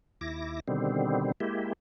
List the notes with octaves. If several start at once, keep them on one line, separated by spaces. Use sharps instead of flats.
D#2 E4 D6 A#6
B2 D3 D#3 G3 C4
G#3 A#3 E4 G4